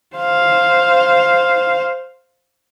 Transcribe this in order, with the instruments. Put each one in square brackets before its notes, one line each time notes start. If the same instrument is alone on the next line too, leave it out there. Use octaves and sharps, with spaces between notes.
[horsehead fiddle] C5 F5